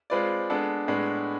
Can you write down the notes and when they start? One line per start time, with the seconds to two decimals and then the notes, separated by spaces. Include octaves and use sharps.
0.10 G#3 C4 F4 B4 D5
0.50 G#3 B3 D4 A4
0.88 A2 G#3 B3 D4